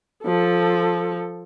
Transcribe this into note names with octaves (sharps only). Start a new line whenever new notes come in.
F3 A4